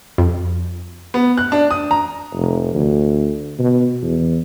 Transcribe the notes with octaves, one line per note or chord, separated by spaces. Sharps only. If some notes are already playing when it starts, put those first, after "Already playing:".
F2
B3
F#6
D4
D#6
A#5
F1
D2
B2
E2